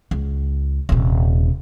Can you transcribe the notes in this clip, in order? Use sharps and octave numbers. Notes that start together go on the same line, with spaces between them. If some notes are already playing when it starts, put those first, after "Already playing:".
C#2
D#1 C3